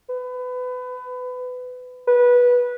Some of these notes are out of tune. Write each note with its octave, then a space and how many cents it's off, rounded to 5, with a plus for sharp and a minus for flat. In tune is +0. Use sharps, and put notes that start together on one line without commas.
B4 +25
B4 -15